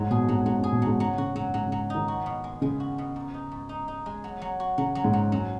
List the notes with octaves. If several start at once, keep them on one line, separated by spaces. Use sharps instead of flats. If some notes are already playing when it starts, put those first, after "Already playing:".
Already playing: G#2 F#3
B2 G#4
G#2 F#3
G#2 F#3
F#2
G#4
B2
G#2 F#3
C#3 F#3
C#3 F#4
G#2 F#3
G#2 F#3
C#3
F#3
D#3 D#4
F#4
B2
G#3
C#3 G#3
F#4
B2
G#2
D#4
G#2
D#4
D#4
G#3
F#3
F#3
F#4
C#3 F#3
F#3
G#2
F#3
F#2 F#3